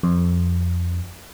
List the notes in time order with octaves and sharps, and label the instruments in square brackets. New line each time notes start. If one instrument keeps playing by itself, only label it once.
[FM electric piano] F2